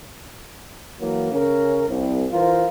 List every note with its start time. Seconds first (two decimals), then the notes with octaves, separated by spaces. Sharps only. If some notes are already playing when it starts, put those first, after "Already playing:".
0.99 E3 F#3 A#3
1.32 C#3 C#4 A#4
1.87 C2
2.31 E3 F4 A#4 C5